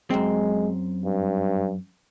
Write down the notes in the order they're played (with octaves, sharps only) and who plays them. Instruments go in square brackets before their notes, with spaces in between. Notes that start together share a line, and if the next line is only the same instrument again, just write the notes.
[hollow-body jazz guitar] F#2 C4 [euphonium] G#3
[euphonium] G2